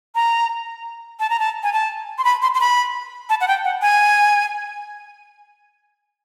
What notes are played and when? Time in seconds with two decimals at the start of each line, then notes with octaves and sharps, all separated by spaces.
0.15 A#5
1.20 A5
1.30 A#5
1.39 A5
1.63 G#5
1.73 A5
2.18 C6
2.24 B5
2.42 C6
2.54 C6
2.60 B5
3.29 A5
3.41 F#5
3.48 G5
3.64 F#5
3.82 G#5